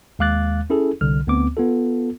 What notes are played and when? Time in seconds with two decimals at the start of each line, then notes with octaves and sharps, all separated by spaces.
0.19 D#2 G#3 F5 D6 F#6 A6
0.70 C#4 E4 G#4 A4
1.01 C2 D3 F6
1.27 D2 B3 C4 D6
1.57 B3 F4 A4